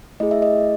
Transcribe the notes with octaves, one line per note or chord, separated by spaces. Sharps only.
A3 E4 G#4 D#5
E5
D#5